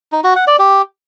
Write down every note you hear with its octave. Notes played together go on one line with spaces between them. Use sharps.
D#4
F#4
F#5
D5
G4